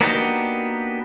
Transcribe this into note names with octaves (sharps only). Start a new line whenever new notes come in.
A#3 B3 D4 D#4 F#4 G4